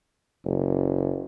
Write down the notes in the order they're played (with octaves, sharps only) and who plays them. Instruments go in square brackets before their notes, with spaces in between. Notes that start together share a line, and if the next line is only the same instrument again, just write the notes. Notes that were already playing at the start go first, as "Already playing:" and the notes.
[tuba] F#1